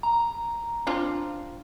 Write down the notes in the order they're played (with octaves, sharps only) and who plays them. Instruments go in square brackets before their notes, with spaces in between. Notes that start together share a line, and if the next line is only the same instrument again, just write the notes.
[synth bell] A#5
[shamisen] C4 D4 F4